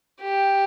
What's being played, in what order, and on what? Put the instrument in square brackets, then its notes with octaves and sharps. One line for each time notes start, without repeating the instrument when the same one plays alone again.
[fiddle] G4